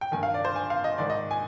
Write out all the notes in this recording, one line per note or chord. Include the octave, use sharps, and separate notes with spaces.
G5
G2 D#3 G#5
F5
D5
C5
G#5
F5
D#5
G#2 D#3 D5
D#5
G#5